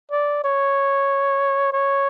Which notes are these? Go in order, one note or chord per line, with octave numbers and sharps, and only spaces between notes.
D5
C#5
C#5